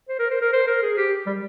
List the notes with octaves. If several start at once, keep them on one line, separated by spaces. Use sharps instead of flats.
C5
A#4
C5
A#4
C5
A#4
G#4
G4
G3